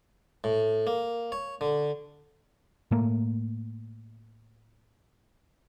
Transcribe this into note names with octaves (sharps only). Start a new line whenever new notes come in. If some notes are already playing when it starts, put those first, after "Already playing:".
A2
A#3
C#5
D3
A2 A3 A#3